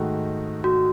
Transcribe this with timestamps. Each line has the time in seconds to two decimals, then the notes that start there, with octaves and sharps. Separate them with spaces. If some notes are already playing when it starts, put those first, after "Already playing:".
Already playing: G#2 D#3 A3 D#4 F#4
0.64 F#4